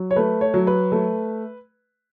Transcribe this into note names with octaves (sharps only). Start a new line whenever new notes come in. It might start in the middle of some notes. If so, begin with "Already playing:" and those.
Already playing: F#3
C#5
A3 B4
C#5
F#3
B4
A3